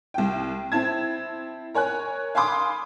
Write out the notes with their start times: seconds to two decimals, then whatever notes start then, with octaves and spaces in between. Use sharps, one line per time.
0.14 C2 G5
0.72 C4 E4 A5 G#6
1.74 A#4 C#5 G#5 F#6
2.35 F5 G#5 B5 C6 D6 D#6